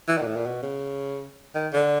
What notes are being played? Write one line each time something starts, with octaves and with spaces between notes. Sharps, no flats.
E3
D#3
A#2
A2
A#2
B2
C#3
D#3
D3